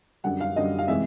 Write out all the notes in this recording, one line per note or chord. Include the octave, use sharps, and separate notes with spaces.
F#2 D3 G3 F#5
F5
F#2 D3 G3 D#5
F5
C3 E3 G#3 E5